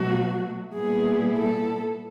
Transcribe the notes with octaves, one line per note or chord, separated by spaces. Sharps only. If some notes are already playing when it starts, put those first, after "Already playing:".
Already playing: B2 F#3 A3 F#4
A#2 G3 B3 E4 G#4
A4